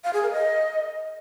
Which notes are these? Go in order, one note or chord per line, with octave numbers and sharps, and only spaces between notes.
F5
G#4
A#4
D#5